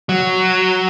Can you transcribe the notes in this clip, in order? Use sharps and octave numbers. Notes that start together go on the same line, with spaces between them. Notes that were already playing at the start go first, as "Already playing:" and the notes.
F#3